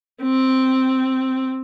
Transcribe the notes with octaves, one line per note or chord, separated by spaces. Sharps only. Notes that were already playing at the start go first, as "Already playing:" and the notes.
C4